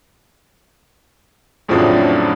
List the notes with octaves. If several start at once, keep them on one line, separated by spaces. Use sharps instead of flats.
F2 A2 C#3 F3 F#3 D4